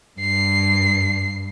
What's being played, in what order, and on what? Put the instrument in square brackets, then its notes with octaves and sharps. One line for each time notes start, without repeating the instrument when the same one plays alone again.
[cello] G2 [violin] C7